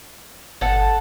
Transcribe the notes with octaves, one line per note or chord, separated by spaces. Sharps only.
G1 A4 F#5